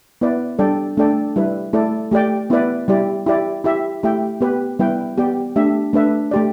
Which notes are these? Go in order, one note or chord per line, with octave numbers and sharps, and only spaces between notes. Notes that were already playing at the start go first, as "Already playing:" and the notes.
B3 E4 B4 D5
G3 D4 A4 D5 G5
A3 D4 A4 D5 G5
G3 E4 B4
A3 E4 A4 D5
A3 G4 D5 G5
B3 E4 B4 D5
G3 E4 G4 D5
E4 G4 D5
E4 G4 E5
A3 E4 G4 E5 G5
B3 G4 B4
G3 B3 E4 B4 G5
B3 G4 D5 G5
A3 D4 G4 E5
A3 D4 B4 E5
A3 G4 D5